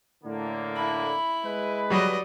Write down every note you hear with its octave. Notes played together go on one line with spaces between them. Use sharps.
A2 D3 A#3
E4 B5
G#3 B4
F#3 G3 D5 D#5